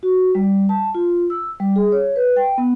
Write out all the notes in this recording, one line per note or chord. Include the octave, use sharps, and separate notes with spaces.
F#4
G3
A5
F4
E6
G3
G#4
C#5
B4
G5
B3